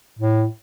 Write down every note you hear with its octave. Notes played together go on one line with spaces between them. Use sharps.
A2